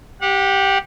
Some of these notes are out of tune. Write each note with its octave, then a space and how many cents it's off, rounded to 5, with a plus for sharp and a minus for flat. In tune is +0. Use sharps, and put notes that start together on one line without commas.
G4 +0 F#5 -30